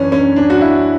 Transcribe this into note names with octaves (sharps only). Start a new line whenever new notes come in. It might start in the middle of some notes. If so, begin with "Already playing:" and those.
Already playing: F#2 E3 C#4 D4
C#4
D4
F#4
E4